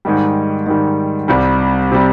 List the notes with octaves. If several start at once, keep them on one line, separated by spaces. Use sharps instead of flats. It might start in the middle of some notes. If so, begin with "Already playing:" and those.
G#2 D#3 G3
G#2 D#3 G3
C2 C3 G3
C3 G3